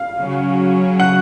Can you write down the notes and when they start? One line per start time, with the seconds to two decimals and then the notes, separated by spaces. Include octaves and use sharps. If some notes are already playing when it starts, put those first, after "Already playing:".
Already playing: F5
0.17 C#3 F#3 C#4 F#4
1.00 F#5